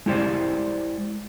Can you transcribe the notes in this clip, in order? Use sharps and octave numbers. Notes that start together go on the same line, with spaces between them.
G#3 E4 G4 C5 D5